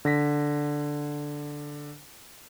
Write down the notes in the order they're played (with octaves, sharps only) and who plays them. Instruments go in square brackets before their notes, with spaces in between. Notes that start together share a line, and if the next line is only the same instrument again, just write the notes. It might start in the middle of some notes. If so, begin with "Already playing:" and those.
[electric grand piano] D3 A#6 B6